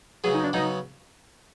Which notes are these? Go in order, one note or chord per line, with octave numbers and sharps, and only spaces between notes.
C#3 F#3 B3 G#4
D#4
D4
C#3 F#3 B3 D#4